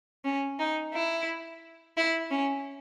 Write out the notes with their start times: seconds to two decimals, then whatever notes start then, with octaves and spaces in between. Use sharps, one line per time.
0.25 C#4
0.59 D#4
0.94 E4
1.97 E4
2.31 C#4